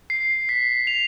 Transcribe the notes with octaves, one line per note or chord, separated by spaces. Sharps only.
C7
B6
F7